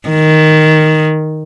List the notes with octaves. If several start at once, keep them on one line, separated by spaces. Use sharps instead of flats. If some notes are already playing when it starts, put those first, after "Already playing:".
D#3